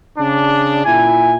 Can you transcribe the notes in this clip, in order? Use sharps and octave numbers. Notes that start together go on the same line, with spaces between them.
C#3 D4
A#2 E4 G#5